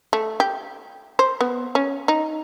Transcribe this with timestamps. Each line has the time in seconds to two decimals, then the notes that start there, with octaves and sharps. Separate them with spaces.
0.13 A3
0.40 G4
1.19 C5
1.41 B3
1.75 C#4
2.08 D#4